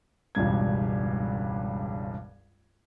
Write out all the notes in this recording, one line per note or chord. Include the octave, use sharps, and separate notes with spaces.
E1 C#2 G2 G#6